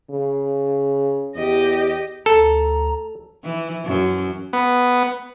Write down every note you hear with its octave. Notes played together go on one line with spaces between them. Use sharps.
C#3
E2 G4 D#5
D2 A4 A#5
E3
F#2
B3